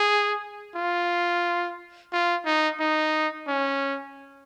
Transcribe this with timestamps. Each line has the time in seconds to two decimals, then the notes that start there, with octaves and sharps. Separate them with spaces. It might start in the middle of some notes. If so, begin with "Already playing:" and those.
Already playing: G#4
0.75 F4
2.12 F4
2.45 D#4
2.80 D#4
3.48 C#4